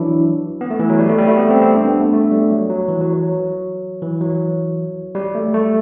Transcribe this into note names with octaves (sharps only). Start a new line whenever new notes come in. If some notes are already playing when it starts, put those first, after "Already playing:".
Already playing: E3 F#3 D4 E4
B3
A3
E3
F#3
G3
A3
G3
A3
B3
C4
C4
D4
B3
A3
A3
G3
F#3
F#3
E3
F#3
F#3
E3
F#3
G3
A3
A3